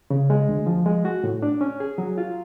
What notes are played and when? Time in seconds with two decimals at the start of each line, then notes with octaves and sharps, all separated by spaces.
0.10 C#3
0.30 G#3
0.49 D2
0.67 F3
0.86 G#3
1.05 F#4
1.24 A2
1.42 D4
1.61 C#4
1.80 G#4
1.98 F#3
2.18 F4